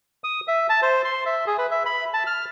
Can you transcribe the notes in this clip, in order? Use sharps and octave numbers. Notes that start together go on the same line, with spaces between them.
D#6
E5
A5
C5
C6
E5
G#4
B4
E5
B5
A5
F6